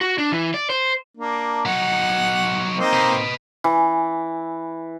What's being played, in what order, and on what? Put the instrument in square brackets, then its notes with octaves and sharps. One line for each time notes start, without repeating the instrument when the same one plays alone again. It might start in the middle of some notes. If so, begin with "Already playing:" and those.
[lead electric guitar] F#4
D4
E3
D5
C5
[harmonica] A#3 D4
[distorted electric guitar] F#3 D#4 [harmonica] F#5
[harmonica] A#3 C4 D#4
[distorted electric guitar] B4 D#5
[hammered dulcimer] E3